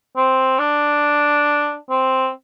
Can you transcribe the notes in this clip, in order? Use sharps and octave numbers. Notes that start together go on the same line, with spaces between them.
C4
D4
C4